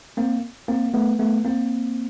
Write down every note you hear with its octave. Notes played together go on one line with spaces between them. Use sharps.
A#3 C4
A#3 C4
A3 B3
A3 B3
A#3 C4